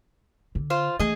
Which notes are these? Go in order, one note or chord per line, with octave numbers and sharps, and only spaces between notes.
D3
F4 C5
E3 A3 G#4 D#5